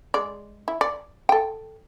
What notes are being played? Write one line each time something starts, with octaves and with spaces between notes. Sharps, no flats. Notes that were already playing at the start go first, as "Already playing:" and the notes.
G#3 D5
E4
D5
A4 G5